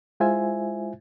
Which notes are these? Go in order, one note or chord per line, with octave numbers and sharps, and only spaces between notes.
G#3 E4 F4 C5 E5 G#5